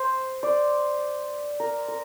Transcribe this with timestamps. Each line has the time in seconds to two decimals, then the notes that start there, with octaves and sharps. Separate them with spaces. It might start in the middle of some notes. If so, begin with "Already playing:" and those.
Already playing: C5
0.43 D5
1.60 A#4
1.88 A#4